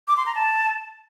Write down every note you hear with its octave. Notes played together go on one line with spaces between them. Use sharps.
D6
C6
A#5
A5